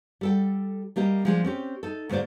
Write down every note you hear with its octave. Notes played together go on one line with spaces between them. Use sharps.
G3 A4 G5
G3 A#3 G4 D#5
F3 G#3 D4
C4 C#4 G4
D#4 A4
D2 G#2 A#3 C5 D5